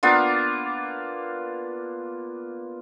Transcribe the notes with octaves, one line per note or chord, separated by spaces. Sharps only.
A#3 B3 D4 F4